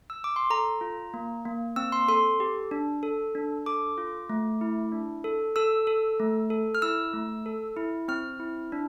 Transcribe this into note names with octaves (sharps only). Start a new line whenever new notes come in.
E6
D6
C6
A4 A#5
F4
A#3
A#3
C4 E6
C6
A4 C6
G4
D4
A4
D4
A4 D6
F4
A3
E4
D4
A4
A4 E6
A4
A3
A4
F6
E4 E6
A3
A4
E4
C4 F6
E4
D4